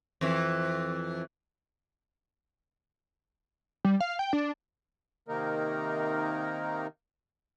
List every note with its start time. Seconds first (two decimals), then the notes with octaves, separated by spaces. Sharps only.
0.21 F2 E3
3.85 G3
4.00 F5
4.19 G5
4.33 D4
5.28 C3 D#3 A#3 D#4 A#4